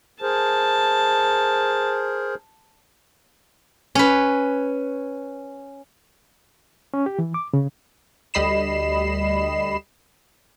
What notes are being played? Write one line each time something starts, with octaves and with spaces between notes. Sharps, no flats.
G#4 A#4 C5 A5
C#4 B4
C#4
G4
E3
D6
C#3
D2 G3 D#5 B5 C7 E7